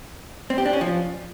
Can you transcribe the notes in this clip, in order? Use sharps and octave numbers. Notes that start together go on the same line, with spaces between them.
C4
G4
D4
C#4
F3